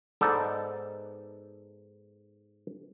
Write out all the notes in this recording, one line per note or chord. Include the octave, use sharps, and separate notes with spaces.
G#2 B3 D#4 A4 D5